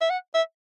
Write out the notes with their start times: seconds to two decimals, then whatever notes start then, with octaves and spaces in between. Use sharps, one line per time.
0.01 E5
0.10 F#5
0.34 E5